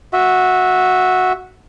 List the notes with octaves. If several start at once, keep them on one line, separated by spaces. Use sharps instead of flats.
F#4 E5